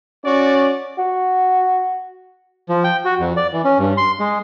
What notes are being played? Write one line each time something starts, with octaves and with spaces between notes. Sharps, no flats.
C#4 F#4 D5
F#4
F3
G5
F#4
F2
D5
E3
C#4
G2
C6
G#3